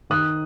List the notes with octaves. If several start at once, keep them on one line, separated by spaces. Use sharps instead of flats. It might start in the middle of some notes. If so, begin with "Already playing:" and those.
D#3 D#6 F#6